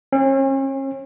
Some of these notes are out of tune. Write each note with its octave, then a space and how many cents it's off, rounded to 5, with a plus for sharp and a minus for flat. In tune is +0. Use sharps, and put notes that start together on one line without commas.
C#4 -40